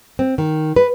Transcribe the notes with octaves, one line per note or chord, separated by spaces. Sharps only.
C4
D#3
B4